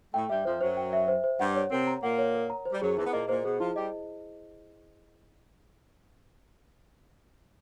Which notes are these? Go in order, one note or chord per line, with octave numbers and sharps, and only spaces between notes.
A2 A3 G5
G2 G3 E5
F2 F3 C5
F#2 F#3 C5
G5
E5
C5
C5
G2 G3 F#5
C#5
C3 C4 A#4
A#5
A#2 A#3 F#5
C#5
A#4
A#5
C5
G3
F#2 F#3 G#4
E2 E3 E4
B3
A#2 A#3 D#5
A#2 A#3 C5
B2 B3 G#4
F3 E4 F4
G3 G4 D#5